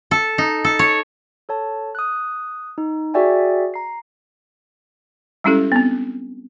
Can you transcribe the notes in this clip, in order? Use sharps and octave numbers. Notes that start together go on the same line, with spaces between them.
A4
D#4
A4
C#5
A4 C#5 A5
D#6 F#6
D#4
F#4 G#4 D5 E5 G5 G#5
A#5 C7
G3 G#3 C#4 E4 G4 A4
B3 C4